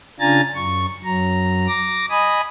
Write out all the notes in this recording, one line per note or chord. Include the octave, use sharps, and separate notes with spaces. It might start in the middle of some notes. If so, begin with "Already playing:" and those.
C#3 D4 F4 G#5 A#5 A6
F#2 C#6
F#2 F#3 A#5
D6 A#6
D#5 G#5 B5 D#6